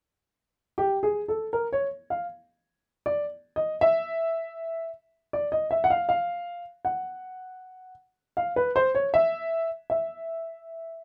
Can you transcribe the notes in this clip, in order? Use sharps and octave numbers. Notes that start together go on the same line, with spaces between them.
G4
G#4
A4
A#4
C#5
F5
D5
D#5
E5
D5
D#5
E5
F#5
F5
F5
F#5
F5
B4
C5
C#5
E5
E5